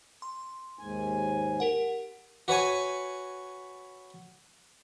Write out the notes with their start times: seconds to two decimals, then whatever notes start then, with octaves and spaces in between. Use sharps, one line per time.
0.22 C6
0.79 D#2 G#2 G#5
1.60 G4 A#4 F#5
2.48 F#4 B4 C#5 G#5